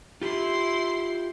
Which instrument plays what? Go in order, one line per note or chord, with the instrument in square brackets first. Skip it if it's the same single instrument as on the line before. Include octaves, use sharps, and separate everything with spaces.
[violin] E4 C6 [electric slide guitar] F4 G4